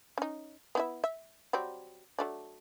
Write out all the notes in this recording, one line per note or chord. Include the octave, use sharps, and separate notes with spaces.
C#4 D#4
B3 E4 E5
E5
F#3 G3 C4
F#3 A3 D4